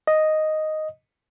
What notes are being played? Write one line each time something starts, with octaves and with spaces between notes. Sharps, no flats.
D#5